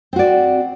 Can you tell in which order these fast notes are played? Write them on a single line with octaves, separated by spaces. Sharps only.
C4 F#4 D5